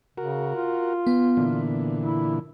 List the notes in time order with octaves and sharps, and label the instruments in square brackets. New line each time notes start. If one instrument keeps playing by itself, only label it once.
[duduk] C#3 [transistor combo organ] F#4 A#4
[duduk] F4
[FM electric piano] B3
[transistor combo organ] A#2 D3 E3
[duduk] E4